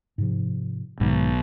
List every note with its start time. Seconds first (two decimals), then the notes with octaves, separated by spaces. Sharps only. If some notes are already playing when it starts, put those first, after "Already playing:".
0.18 G#2 C3 F3
1.00 B1 G#2 D#3